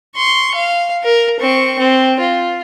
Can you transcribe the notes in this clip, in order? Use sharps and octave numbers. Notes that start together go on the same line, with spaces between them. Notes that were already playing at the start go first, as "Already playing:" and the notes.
C6 C#6
F5
A#4
C4 C#6
C4
F4